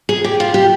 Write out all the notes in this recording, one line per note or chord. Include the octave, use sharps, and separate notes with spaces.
G#4
G4
F4
G4